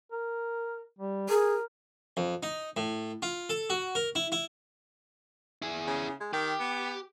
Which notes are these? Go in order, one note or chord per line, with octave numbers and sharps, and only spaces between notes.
A#4
G3
G#4 A#4
F2
D#4
A2
F4
A4
F#4
A#4
E4
E4
E4 G#4
C#3
G#3
D#3 G4
B3